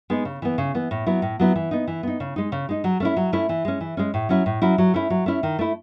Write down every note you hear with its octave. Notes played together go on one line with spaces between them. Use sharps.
G#3 B3 D#4
C#3
E3 B3
C#3
E3 B3
A2
F#3 B3 E4
A2
F#3 B3 E4
E3
B3 D#4
E3
B3 D#4
C#3
G#3 D#4
C#3
G#3 D#4
F#3
A3 C#4 E4
F#3
A3 C#4 E4
E3
G#3 C#4
E3
G#3 C#4
A2
F#3 C#4 E4
A2
F#3 C#4 E4
F#3
A3 C#4 E4
F#3
A3 C#4 E4
D#3
A3 E4